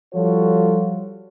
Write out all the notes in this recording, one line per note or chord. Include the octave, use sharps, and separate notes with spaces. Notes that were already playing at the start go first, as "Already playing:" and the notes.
F3 G3 F4 F#4 A4 C#5